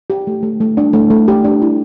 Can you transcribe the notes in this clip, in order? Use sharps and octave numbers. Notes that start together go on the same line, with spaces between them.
G4
A3
A3
A3
D4
A3
A3
G4
D4
E4